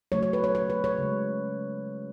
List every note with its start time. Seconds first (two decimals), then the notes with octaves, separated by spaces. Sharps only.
0.12 C#3 F#3 A3 C#5
0.23 C#5
0.33 B4
0.44 C#5
0.55 C#5
0.70 B4
0.84 C#5
0.98 C#3 G#3